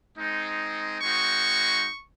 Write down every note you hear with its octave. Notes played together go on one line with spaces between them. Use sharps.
G#3 C4 D#4
G#3 C4 D#4 F#4 C#6